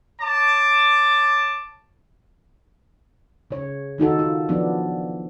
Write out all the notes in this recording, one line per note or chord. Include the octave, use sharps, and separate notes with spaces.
C#5 A5 D6
C#3 C#5
D#3 D#4 F#4 A4
F4
F3 F#3 B3 D4